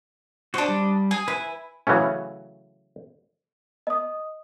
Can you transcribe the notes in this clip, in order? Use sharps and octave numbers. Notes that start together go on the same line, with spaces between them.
D4 F#4 C5 D#5
G3
G#4 G#5
E4 B4 G#5
C#3 E3 F#3 A3 C#4
D#5 D#6